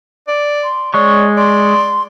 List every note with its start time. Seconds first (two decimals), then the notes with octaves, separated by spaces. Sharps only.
0.28 D5
0.63 C6
0.94 G#3 C#5 D5 C#6
1.37 D5 C6